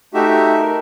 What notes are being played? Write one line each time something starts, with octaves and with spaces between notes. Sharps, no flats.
A3 D#4 F#4 G4 E5
A#4